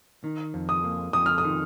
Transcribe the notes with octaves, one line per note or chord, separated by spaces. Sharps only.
D#3
F2
D#6
A#3
F2 D#6
F6
D#6
D#3